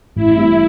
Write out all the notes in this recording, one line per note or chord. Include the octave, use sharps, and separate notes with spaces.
A1 E4
A2 G3 C4